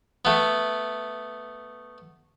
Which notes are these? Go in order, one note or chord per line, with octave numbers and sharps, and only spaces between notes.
A3 B3